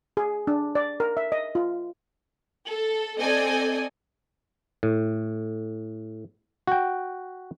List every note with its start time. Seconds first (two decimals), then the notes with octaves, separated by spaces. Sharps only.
0.17 G#4
0.47 D4
0.75 D5
1.00 A#4
1.17 E5
1.32 D#5
1.55 F4
2.68 A4
3.19 C4 A4 D5 D#5 G#5
4.83 A2
6.68 F#4 G5